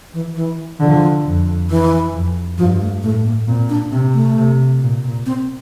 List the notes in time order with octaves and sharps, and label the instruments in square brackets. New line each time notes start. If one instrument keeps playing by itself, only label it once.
[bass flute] E3
E3
[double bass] D3 [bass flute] F3
[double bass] F2
[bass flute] E3
[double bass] F2
[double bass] G2 [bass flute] F3
[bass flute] A3
[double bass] A2 [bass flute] A3
[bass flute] A#3
[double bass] A#2 [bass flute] C4
[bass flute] D4
[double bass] C3 [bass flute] C4
[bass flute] A3
[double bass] C3
A#2
[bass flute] C4